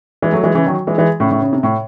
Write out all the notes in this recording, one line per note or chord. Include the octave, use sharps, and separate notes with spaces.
E3 G#3
F#3 A3
E3 G#3
C#3 E3
D#3 F#3
E3 G#3
E3 G#3
A2 C#3
A2 C#3
C#3
C3
A2